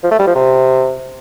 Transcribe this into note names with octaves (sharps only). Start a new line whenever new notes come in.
F3
A3
G3
F3
C3